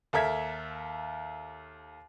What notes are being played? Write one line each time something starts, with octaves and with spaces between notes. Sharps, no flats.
D#2 A4 A#4 E5 G#6 B6